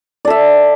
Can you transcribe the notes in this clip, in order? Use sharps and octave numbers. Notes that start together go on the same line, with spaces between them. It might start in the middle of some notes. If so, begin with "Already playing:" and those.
A4 D5 E5